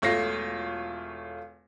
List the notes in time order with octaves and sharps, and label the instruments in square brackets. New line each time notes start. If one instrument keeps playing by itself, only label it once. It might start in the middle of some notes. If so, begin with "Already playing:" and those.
[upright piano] E1 A3 F4 C#5 A#6 C7